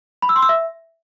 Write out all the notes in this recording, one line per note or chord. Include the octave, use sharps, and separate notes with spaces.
B5
E6
C6
E6
E5